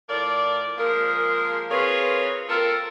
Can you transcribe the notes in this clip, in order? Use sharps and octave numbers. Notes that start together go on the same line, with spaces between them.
A2 F3 A#4 D5
F3 G#3 A#3 G#4 A#4
C4 F4 G#4 A#4 B4 C#5
A#3 C4 F4 A4 A#4